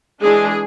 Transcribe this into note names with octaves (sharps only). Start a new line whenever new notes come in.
E3 G#3 D4 G#4